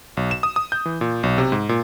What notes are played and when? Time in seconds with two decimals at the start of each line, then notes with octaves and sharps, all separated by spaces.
0.17 B1
0.31 E7
0.43 D#6
0.56 D#6
0.72 G6
0.86 E3
1.01 A#2
1.23 B1
1.38 C3
1.52 G#2
1.69 A#2